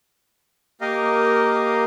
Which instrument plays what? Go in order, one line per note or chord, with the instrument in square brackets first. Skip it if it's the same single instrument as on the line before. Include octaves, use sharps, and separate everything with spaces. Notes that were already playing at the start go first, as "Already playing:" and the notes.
[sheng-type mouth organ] A#3 G4 A#4 D#5 F5